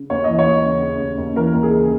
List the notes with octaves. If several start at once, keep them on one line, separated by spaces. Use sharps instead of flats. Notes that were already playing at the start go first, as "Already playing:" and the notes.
Already playing: C#3
D#2 C#5
E3 D#5
C#5
D#2
C#3
C#3
D#2
D#2
E3 A#4
D#2
G#4
C#3